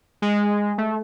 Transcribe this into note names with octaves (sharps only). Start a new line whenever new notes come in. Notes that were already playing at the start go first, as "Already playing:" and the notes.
G#3
A3